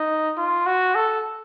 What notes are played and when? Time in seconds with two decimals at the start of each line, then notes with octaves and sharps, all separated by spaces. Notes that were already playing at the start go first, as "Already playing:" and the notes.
Already playing: D#4
0.37 F4
0.66 F#4
0.95 A4